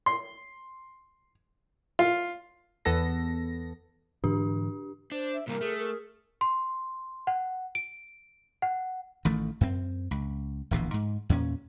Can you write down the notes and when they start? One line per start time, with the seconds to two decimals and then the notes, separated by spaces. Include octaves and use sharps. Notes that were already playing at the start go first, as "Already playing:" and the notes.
0.06 C6
1.99 F4
2.85 E2 B3 A4 A#6
4.24 G#2 D3 E3 D4 G4
5.12 D4 C5
5.34 E5
5.48 C3 E3 G3 A#3 A#4
5.61 A3 G#4
5.78 A#4
6.41 C6
7.27 F#5
7.75 D7
8.62 F#5
9.25 A1 D#3 A3
9.61 F#2 C4
10.11 C#2
10.71 D1 A#1 B2 E3
10.94 G#2
11.29 E2 A#2 C#4